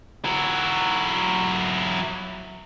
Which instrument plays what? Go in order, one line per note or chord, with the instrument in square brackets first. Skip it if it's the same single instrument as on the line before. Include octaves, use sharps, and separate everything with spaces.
[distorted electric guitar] F#3 E4